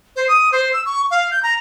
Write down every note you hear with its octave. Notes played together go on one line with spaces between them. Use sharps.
C5
D#6
C5
E6
C#6
F5
G6
A#5